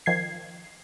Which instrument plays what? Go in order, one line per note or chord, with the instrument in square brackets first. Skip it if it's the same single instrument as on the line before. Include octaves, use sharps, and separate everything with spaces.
[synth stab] D#3 F3 G#6 C7